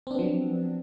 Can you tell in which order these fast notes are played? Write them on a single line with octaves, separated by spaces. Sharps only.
C4 D4 B3 F3 F#3